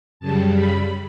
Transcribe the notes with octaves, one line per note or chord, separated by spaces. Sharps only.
F#2 C#3 G3 A5
B5